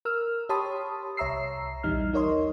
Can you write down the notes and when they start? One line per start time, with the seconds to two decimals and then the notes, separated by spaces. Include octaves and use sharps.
0.05 A#4 E6 F6
0.49 G4 C#5 A5 B5 C6 D#6
1.17 C2 C#5 E5 A#5 E6 C7
1.83 A#1 D#2 E3 G3 D#4 F6
2.13 D#4 A#4 C#5 D#5 C6